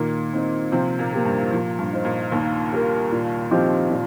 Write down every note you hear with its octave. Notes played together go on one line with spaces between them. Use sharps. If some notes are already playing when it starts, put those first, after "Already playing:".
Already playing: A#2 D#3 A#3
C4 D#4 C5
C3 F3 C4
A#2 A#3
A#3 G4 A#4
G2
A#2 F3
G2
D#4 C5
A#2
D#2 D#3 A#3
G4 A#4
A#2
F3 C4 D#4 G4
A#2